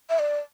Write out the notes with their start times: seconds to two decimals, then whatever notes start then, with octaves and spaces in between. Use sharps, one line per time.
0.10 E5
0.19 D5